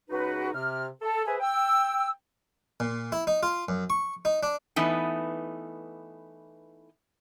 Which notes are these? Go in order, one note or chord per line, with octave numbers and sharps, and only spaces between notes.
C#2 D#4 F#4 B4
C3 F6
A4
G#4 B4 C5 E5 G#5
G5 E6
A#2
E4
D#4
F4
F#2
C#6
D#4
D4
E3 A3 B3 D#4